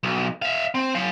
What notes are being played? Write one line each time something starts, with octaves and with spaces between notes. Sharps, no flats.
B1
E5 F5
C4
F#3 F5